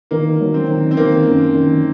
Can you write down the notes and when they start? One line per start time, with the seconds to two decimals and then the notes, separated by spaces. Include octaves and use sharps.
0.11 D#3 A#3
0.40 F#3
0.54 C4
0.68 D#3
0.91 C4
0.97 D#3 A#3
1.27 F#2
1.54 D#3